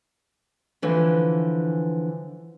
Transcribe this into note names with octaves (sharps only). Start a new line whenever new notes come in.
D3 E3 F3